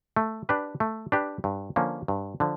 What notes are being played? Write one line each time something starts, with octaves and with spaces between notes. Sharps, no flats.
A3
D4 G4 B4
A3
D4 G4 B4
G2
D3 F3 A#3 C#4
G2
D3 F3